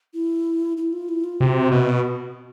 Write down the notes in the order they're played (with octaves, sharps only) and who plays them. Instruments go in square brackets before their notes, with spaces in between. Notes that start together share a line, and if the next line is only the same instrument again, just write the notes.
[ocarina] E4
E4
F4
E4
F4
[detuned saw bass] C3 [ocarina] F#4
[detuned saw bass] B2